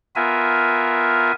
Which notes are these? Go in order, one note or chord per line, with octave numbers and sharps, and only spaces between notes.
B3 F4 A#4 E5 G#5